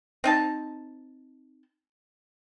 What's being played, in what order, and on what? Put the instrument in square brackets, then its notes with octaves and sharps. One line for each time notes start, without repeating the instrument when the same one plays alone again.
[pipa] C4 D#4 A5